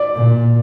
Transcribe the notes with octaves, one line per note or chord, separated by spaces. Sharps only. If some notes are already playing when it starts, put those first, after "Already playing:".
Already playing: D5
A#2